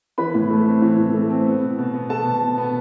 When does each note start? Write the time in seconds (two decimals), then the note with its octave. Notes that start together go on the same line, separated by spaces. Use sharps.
0.18 E3 B4 B5
0.35 A2
0.50 A3
0.66 C4
0.82 E3
0.99 A2
1.14 A3
1.30 C4
1.46 B3
1.62 B2
1.78 B2
1.94 B3
2.09 B3 A4 A5
2.25 B2
2.42 B2
2.58 B3